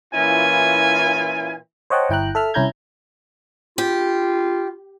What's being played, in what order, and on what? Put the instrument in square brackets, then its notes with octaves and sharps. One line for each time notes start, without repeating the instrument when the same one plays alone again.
[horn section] A#2 E3 C#4 E4 F4 G#5
[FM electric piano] C5 C#5 D#5 F#5 G5 A5
G1 E4 G5 A#5 F#6
A4 E5 F6
C2 C#4 E4 A#5 G6 G#6
[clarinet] F4 [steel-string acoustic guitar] G4